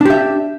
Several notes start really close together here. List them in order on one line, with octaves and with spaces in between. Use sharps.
D4 G4 E5